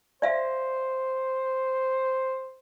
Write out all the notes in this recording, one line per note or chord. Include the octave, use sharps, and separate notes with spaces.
C5 D5 E5 F5